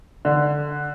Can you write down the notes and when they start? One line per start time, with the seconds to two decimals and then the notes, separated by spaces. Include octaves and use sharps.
0.25 D3